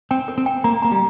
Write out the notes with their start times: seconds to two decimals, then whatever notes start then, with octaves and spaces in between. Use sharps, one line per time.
0.11 C4 G5
0.28 A#4
0.38 C4
0.46 G5
0.64 A#3 A#5
0.82 A#3 A#5
0.91 G3